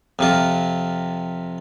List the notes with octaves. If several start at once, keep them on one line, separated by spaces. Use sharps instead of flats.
F2 C3 F4